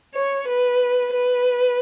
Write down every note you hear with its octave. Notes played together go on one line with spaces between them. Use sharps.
C#5
B4
B4